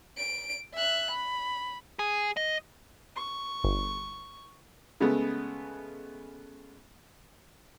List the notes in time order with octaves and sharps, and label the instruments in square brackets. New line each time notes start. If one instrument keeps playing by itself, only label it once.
[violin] D7
E5 F#6
B5
[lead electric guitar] G#4
D#5
[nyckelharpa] C#6
[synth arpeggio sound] G1
[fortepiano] C#3 G#3 A3 B3